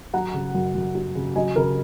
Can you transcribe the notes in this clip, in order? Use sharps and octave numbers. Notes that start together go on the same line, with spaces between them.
F#3 F#5 A#5
C#3
F#2
F#2
F#3
C#3
F#3 D#5 G#5
C#3 A#4